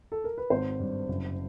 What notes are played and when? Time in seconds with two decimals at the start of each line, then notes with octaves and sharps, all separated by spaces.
0.12 A4
0.24 A#4
0.38 B4
0.50 G#1 C5
0.79 G2
1.08 F#1